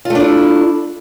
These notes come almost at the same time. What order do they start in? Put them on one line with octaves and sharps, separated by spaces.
F4 A3 D4 E4